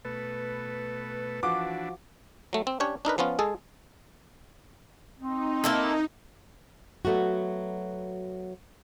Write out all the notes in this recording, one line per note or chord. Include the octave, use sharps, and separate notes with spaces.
B2 A3 A4 B4
E3 F3 D4 F#4 D6
F#3 A3
C4
C#4 D4 G4 C#5
D4 D#4 A#4 B4
F3 B3 C#4 F4
G#3 G#4 A4
C4 D#4
A#3 E4 A4
F#3 A3 B3 F#4